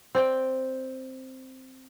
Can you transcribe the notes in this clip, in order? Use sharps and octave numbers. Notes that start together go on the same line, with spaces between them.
C4 D5 G5